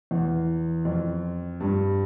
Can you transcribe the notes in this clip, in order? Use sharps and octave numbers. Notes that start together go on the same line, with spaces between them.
E2
F2
G2